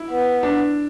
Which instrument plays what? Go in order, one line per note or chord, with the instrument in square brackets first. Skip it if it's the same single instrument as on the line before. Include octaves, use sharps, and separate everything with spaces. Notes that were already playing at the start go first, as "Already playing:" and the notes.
Already playing: [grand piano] E4
[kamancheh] B3
[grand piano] D4